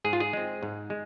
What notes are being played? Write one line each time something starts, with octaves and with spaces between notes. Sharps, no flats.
G#2 G#4
F4
G#4
G#3 C4
G#2
G#3